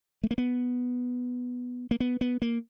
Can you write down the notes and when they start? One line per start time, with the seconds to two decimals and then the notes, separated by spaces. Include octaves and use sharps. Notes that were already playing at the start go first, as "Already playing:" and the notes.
0.24 A3
0.31 A#3
0.38 B3
1.91 A#3
2.00 B3
2.21 B3
2.42 A#3